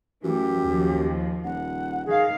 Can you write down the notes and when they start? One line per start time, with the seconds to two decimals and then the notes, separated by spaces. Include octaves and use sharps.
0.24 F#2 E3 A3 G4
0.63 D#2 F3
1.44 D#1 F#5
2.06 D#3 G#4 F5